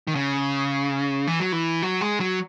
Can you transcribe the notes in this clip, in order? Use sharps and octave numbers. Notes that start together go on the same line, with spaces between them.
D#3
C#3
E3
F#3
E3
F#3
G#3
F#3